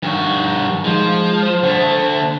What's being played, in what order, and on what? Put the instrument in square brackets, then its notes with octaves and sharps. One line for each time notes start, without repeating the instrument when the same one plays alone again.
[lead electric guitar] G2 F#4 [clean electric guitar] D#3
[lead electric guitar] F3 [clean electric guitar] G#3
[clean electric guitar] C5
[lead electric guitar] D3 A3